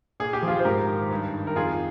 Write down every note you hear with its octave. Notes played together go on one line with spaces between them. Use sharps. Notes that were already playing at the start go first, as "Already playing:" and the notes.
A#2 G#4
G4
F3
F4 G#4
C5
G#2 G4 A#4
D#3
G2
D#3
A#4
F2 F4 G#4